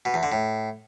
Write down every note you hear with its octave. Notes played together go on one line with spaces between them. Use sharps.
B2
E2
D3
A2